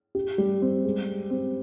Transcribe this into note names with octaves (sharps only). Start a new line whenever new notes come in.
G4
G3
C4
G#3
G#3
C4